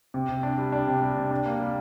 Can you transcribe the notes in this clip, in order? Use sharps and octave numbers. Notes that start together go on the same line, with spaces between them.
C3
C3
D4
G3
D4
C3
G3
C3
D4
A#3
G3